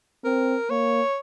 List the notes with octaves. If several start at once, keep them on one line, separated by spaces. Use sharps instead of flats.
C4 A#4
A#3 C#5